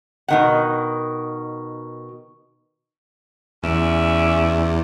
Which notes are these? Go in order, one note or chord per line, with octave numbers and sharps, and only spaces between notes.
B2 D#3 F#5
E2 C#4 D5 E5